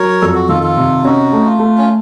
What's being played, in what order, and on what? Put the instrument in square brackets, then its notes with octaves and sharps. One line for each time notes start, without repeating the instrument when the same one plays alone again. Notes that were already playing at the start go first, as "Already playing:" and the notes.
Already playing: [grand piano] F#3 [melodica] A#4 C#5
[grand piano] F2 [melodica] A4
[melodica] F#4
[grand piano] D#3 [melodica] F4 A4
[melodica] F4 A4
[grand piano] C3
[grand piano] C#4 [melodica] D#4 F#4
[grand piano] A3
[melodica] F4
[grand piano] A3
[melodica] C#4